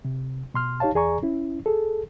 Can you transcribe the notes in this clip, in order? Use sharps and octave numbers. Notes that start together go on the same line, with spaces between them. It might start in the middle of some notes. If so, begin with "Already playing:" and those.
C3
B2 C6 F6
D#4 G4 C#5 F5 A5
E2 G#4 D5 G#5 A#5 C#6
C#4 E4
G#4 A4